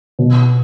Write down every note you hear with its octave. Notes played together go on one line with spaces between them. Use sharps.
B2